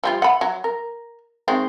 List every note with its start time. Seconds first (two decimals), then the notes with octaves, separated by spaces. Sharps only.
0.04 F3 G3 F4
0.22 F#5 B5
0.41 F#3
0.64 A#4
1.48 D#3 G#3 C4